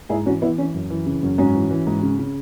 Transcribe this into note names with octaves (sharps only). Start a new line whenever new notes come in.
G#2 E4 G#4
E3 C#4 F#4
E3 B3 E4
E3 C#4
F#2
E3
C#3
F#2
G#2 C#4 F#4
E3
E3
G#2
C#3
C#3